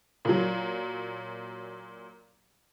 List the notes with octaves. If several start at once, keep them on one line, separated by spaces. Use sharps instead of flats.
A#2 F#3